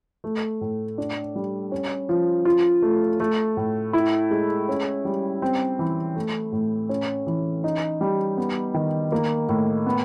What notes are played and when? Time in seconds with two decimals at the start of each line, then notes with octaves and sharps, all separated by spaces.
0.24 A3
0.61 A2
0.98 D4
1.36 G3
1.72 C#4
2.09 F3
2.45 F4
2.82 A3
3.20 A3
3.57 A2
3.93 E4
4.31 G#3
4.69 C#4
5.05 G3
5.42 C4
5.79 E3
6.16 A3
6.52 A2
6.89 C#4
7.27 E3
7.64 D#4
8.01 G3
8.37 B3
8.74 D#3
9.12 A#3
9.49 A2
9.86 B3